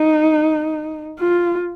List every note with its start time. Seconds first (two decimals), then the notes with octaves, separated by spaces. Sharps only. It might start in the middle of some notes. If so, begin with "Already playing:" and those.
Already playing: D#4
1.20 F4